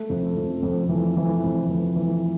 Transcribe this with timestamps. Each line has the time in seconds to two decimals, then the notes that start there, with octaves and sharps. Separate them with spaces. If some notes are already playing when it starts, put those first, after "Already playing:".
Already playing: A3
0.10 F2
0.37 F2
0.63 F2
0.89 E3
1.17 E3
1.43 F2
1.70 E3
1.96 E3